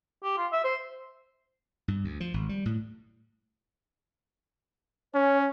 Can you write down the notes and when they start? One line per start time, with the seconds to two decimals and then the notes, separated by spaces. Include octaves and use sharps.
0.24 G4
0.37 F4
0.52 E5
0.64 C5
1.88 G2
2.04 D2
2.20 F3
2.34 G#1
2.49 G3
2.66 A2
5.14 C#4 C#5